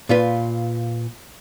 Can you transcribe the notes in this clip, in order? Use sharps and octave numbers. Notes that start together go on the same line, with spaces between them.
A#2 F4 B4